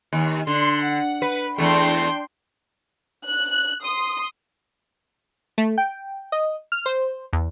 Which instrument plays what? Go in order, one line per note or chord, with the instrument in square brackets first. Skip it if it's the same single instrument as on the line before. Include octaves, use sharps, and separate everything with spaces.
[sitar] D#2
[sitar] D3 [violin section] C6 F#6
[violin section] F#5
[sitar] B4
[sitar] E2 A3 [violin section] D4 G5 C6
[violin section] F#6
C6 D#6
[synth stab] A3
G5
D#5
F6
C5
E2